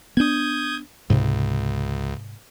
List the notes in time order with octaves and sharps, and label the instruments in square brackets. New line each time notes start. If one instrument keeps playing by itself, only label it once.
[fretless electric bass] B3 D4 [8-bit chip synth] D#6 G6 G#6
[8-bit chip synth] C#2 [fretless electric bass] G#2 C3